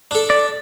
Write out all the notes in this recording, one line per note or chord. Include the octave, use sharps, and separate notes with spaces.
D4 A4
D5